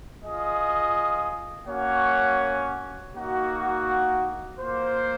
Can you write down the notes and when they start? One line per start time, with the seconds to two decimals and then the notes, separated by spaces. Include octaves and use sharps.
0.22 F4 G#4 D#5
1.67 A#3 C#4 F#4 C#5 F#5
3.13 A#3 D#4 F#4
4.59 A#3 F4 C5